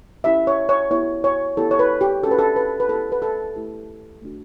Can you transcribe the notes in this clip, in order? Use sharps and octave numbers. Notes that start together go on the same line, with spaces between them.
C#4 E4 G4 E5
C#5
C#5
B3 E4 G4 C#5
C#5
B3 E4 G4 A4
C#5
B4
G4
C#4 F#4 A4
B4
A4
B4
B4
B3 E4 G4 A4
B4
A4
A3 E4 G4
A3 D4 F#4